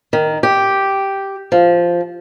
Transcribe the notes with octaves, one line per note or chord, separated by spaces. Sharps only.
D#3
G4
F3